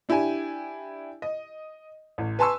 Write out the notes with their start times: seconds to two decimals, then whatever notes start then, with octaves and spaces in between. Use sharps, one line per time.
0.09 D4 E4 G4 G5 G#5
1.22 D#5
2.18 A1
2.39 B4 G#5 A5 C6 C#6 E6